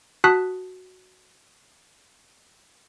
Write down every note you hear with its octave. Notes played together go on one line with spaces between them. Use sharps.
F#4 A5 D#6 F#6 B6